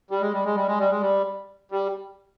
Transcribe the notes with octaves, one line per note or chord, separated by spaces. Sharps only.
G3
G#3
G3
G#3
G3
G#3
G3
G#3
G3
G3